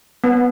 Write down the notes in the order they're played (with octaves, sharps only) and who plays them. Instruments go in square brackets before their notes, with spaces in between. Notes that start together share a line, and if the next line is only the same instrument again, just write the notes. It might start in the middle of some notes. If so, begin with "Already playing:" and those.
[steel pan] B3